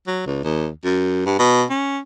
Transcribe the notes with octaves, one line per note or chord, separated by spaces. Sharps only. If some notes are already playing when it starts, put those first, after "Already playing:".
F#3
C#2
D#2
F#2
G2
B2
C#4